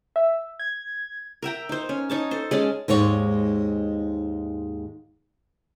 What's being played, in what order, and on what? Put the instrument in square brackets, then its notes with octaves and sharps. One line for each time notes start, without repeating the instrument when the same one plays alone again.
[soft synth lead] E5
G#6
[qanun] A#4 E5 G5 A#5
D#4 C5
C#4
D#4 C#5 A5
A4 C5
G#3 C#4 D#5 A5
[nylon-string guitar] D#2 G#2 G#3 C#5 D5